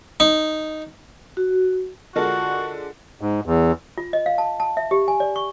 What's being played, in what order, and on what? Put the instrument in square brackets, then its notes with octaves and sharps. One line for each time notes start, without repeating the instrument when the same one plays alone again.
[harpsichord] D#4
[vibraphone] F#4
[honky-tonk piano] D3 G#3 D4 [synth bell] F4 A#4 A5 [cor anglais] F#4
[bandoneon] G#2
E2
[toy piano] F4
D#5
F5
A5
A5
E5
G4
G#5
D5
C#6